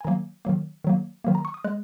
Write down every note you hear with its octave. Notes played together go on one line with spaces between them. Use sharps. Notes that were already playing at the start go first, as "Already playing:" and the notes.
G#5
D#3 F#3 A#3 A#5
D#3 F#3 A#3
D#3 F#3 A#3
D#3 F#3 A#3
A#5
C#6
D#6
G#3 F#6